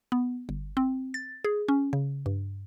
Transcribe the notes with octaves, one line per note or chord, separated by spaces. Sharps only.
B3
G1
C4
A6
G#4
C#4
C#3
G2